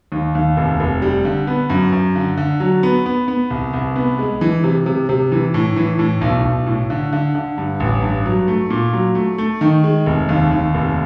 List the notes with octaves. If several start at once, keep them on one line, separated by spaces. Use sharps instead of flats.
D#2
D#2
F1
F1
G3
D3
B3
F#2
F#2
D3
D3
F#3
B3
B3
B3
C2
C2
B3
G#3
E3
C3
C3
C3
E3
A2
E3
A2
B1
B1
A2
D3
D3
D3
G2
A1
G2
F#3
A3
A#2
F#3
A3
A3
D#3
G#3
F1
D#2
D#2
F1